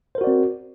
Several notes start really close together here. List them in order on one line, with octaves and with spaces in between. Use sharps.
C5 A#4 F#4 D5 C4